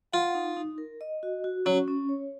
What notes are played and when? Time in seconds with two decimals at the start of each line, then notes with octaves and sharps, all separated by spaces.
0.13 F4 F#5
0.35 D#4
0.57 D#4
0.78 A#4
1.01 D#5
1.23 F#4
1.44 F#4
1.65 F#3 C#4
1.88 C#4
2.09 C#5